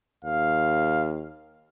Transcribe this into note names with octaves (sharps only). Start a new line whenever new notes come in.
D#2 F5